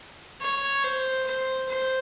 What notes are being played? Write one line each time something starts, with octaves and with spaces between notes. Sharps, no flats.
C#5
C5
C5
C5